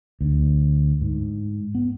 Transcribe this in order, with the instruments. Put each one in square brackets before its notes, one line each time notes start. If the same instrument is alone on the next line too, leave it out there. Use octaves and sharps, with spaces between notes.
[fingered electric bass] D2
G#2
B3